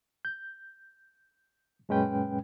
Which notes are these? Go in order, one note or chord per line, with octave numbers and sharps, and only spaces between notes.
G6
F#2 A#2 G#3 C#4 B4 G5